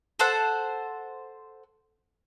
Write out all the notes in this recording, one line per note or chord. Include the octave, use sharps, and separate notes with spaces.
A4 C5 F#5